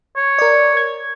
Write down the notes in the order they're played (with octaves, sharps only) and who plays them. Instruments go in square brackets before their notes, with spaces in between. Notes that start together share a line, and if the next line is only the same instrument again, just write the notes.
[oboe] C#5
[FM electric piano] A#4 D5
G#6